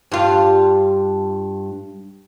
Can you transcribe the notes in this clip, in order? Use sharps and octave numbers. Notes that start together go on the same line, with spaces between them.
G2 F4